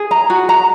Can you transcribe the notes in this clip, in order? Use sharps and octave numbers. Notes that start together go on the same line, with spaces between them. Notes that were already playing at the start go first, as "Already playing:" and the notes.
Already playing: G#4
A#5
F#4
A#5